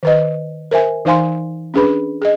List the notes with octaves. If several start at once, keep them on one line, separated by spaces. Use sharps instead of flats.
D#3 B4 D#5
A#4 C5 E5 G#5
E3 D#4 C5 F5 G#5 C6
C#4 D4 G#4 B4 B5
G#4 D#5